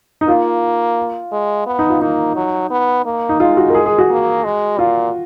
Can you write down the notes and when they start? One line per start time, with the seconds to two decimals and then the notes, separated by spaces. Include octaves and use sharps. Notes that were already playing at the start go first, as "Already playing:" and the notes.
0.21 D#4
0.28 A#3 F4
1.32 G#3
1.67 B3
1.79 D#4
1.90 F4
2.01 A#3 D#4
2.36 F#3
2.71 B3
3.05 A#3
3.29 D#4
3.40 G#3 F4
3.57 F#4
3.70 A#4
3.74 G#4
3.86 G#4
3.99 F#4
4.10 A#3
4.44 G#3
4.79 A#2 F4